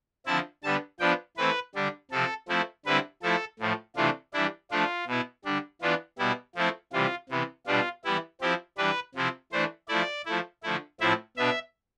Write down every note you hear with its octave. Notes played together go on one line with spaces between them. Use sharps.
D3 F3 C4 E4 A5
D3 G3 B3 A5
F3 B3 D4 G5
E3 A3 C4 E4 B4
D3 G3 D4
C3 F3 C4 A4
F3 A3 C4 E4
D3 G3 C4 E4 B4
F3 A3 E4 A4
A2 F3 A3
C3 E3 A3 D4 F4
E3 G3 D4 E4
F3 A3 D4 F4
B2 B3 E4
D3 G3 D4
E3 B3 D4 F4
B2 G3 B3 E4
F3 A3 C4 E4
C3 E3 G3 F4
C3 E3 B3
B2 G3 D4 F4
E3 G3 B3 E4
F3 C4 E4 G4
E3 G3 D4 B4
C3 F3 C4 E4
E3 A3 D4 C5
F3 A3 E4 D5
F3 A3 E4
D3 F3 A3 E4
A2 F3 C4 E4 E5
B2 B3 D4 E5